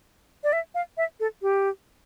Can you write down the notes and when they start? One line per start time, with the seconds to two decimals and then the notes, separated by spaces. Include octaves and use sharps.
0.44 D5
0.53 E5
0.75 F5
0.97 E5
1.20 A4
1.42 G4